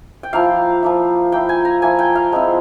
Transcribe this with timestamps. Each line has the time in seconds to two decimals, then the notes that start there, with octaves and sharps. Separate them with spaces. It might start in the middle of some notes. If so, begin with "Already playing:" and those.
0.23 G5
0.33 F3 A#3 E4 F5
0.83 F3 A#3 E4
1.32 F3 A#3 E4 G5
1.49 G#5
1.65 A#5
1.82 F3 A#3 E4 G#5
1.99 G5
2.15 F5
2.32 F3 G#3 C4 E4